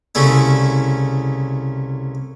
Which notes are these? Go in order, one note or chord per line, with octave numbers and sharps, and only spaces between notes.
C2 C#3 A3 C#4 E4